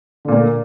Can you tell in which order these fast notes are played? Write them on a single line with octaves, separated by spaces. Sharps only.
D3 A#2 A#3